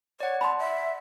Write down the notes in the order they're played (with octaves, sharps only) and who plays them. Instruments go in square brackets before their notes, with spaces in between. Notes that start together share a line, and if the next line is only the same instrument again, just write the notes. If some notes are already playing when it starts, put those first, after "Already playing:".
[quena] C#5 [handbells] D5 F#5
[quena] A5 [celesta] B5 C6
[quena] E5